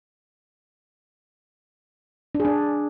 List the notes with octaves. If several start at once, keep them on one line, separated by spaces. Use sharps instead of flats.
D4
G#4
D4